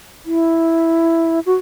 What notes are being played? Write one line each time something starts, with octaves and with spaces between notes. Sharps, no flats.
E4
F#4